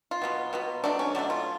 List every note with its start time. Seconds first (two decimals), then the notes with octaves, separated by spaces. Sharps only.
0.11 F4
0.22 B2 F#3 B3
0.53 B2 F#3 B3
0.84 B2 F#3 A3 D4
0.99 C#4
1.15 B2 F#3 A3 D4
1.30 F4